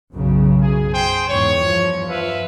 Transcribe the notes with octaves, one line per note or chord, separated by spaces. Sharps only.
B1 F#2 C#3
G#4
G#4 C5 G5
E2 G#2 C#5
G2 F3
B4 E5 F5